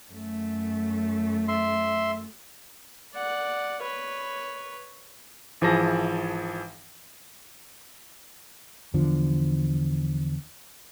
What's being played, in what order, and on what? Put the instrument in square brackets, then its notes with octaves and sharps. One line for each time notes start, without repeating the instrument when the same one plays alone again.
[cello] F#2 A3
[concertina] E5 C6
[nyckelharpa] D5 F#5
B4 C#5
[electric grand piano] G#1 E3 F3 G#4 A5 A#6
[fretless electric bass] E2 D3 F3